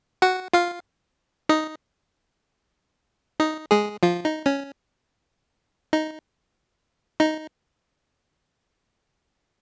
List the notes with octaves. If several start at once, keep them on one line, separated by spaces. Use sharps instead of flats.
F#4 F#5
F4 F5
D#4 D#5
D#4 D#5
G#3 G#4
F3 F4
D#4
C#4
D#4
D#4